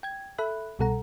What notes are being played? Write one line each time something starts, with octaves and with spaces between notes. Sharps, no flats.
G5 G#6
A4 E5 B5 F#6
C2 B2 G3 A4 F#5 A#5